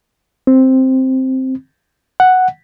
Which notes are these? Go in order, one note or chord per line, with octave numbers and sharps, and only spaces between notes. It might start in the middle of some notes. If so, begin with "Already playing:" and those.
C4
F#5